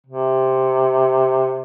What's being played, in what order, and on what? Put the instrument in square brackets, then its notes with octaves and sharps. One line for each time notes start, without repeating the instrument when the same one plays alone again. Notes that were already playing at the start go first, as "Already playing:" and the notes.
[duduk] C3